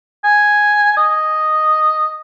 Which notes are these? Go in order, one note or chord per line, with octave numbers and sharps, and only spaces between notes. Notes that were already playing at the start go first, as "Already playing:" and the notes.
G#5
D#5